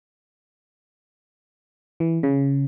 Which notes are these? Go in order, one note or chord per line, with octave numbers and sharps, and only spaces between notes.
E3
C#3